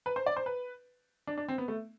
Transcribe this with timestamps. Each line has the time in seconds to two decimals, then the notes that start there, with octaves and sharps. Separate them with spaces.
0.06 B4
0.16 C5
0.26 D5
0.37 C5
0.46 B4
1.27 D4
1.38 D4
1.48 C4
1.58 B3
1.68 A3